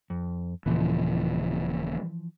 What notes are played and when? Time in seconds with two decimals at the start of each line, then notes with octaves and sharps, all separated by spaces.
0.10 F2
0.66 D#1 A#2 C#3 E3 F3